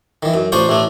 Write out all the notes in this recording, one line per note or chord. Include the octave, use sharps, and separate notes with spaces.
D#3 E3
F#2
A1 D4 F4 C5 C#6 D#6
A1 A2 A3 D4